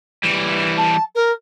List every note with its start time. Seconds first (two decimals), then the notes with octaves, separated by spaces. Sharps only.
0.24 E3 G3
0.77 A5
1.15 A#4